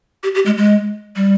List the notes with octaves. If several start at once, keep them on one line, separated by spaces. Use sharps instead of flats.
G4
G4
G#3
G#3
G3